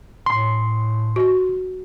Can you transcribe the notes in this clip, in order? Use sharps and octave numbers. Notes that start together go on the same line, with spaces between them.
A2 C6
F#4